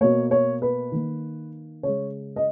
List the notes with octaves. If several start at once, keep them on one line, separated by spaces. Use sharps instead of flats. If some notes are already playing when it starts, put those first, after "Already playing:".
B2 A#3 C#5
C#5
B4
D#3 A#3
C#3 G#3 C#5
D#5